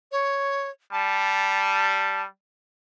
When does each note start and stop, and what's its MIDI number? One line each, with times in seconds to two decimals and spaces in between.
0.12 0.70 73
0.92 2.26 55
0.92 2.22 81